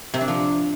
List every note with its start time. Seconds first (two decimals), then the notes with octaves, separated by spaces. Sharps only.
0.14 C3
0.21 D4
0.28 F3